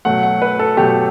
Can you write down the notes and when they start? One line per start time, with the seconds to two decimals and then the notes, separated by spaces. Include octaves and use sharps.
0.05 B2 F#3 A3 F#5
0.23 F#5
0.42 B4
0.59 A4
0.77 B2 F#3 A3 G4